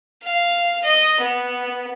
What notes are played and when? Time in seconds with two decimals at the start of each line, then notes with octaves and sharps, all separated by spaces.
0.23 F5
0.84 D#5
1.20 B3